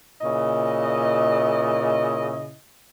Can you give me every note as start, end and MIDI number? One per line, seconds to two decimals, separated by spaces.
0.21 2.54 46
0.21 2.54 49
0.21 2.54 64
0.21 2.54 75